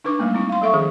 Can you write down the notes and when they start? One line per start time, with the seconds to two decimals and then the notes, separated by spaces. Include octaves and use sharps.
0.04 D4 D#4 B4 D6
0.19 F#3 G3 A3 A#3 C#4
0.34 C4 D#4 E4
0.49 F5 C6
0.62 F#3 A4 E5 C#6
0.73 D#3 F3 C#4 G#4